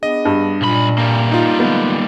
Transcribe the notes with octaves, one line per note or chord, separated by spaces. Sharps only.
B3 D4 G#4 D#5
G2
B1 A#2 B5
G3 A#3
D#4 F4
D3 F#3 G#3 B3